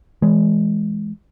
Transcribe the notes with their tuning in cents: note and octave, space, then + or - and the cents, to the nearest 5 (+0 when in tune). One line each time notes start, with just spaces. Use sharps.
E3 +0 G#3 +10